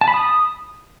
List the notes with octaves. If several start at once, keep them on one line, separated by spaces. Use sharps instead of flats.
A5
B5
D#6